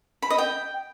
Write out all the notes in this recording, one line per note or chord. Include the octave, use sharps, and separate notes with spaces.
B5
D#5
G5